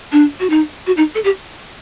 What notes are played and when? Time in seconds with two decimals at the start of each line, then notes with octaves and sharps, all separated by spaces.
0.12 D4
0.40 F#4
0.50 D#4
0.87 F#4
0.97 D#4
1.15 A4
1.24 G4